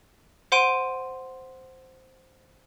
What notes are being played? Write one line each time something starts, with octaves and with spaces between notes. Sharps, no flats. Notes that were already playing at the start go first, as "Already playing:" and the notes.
C5 F#5 C6 D7 D#7